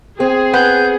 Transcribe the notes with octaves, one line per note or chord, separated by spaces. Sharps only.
C4 G#4
B3 G6